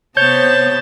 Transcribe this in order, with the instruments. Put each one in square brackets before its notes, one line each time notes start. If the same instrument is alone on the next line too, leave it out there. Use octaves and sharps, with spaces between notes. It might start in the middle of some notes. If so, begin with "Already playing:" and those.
[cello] C3 B3 [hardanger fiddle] C5 A5 [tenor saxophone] C#5 [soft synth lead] G6